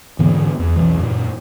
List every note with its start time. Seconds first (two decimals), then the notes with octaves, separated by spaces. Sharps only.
0.19 G#2 D3 E3 B3
0.59 E2
0.76 E1 B1 E3
1.00 F#2 A#2